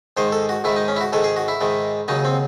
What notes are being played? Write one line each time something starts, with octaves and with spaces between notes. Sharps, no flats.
G#2 D#3 G#3 C5
A4
F#4
G#2 D#3 G#3 E4
D#4
C#4
E4
F#4
G#2 D#3 G#3 A4
G#4
F#4
E4
G#2 D#3 G#3
D#2 C#3 F#3 D#4
C4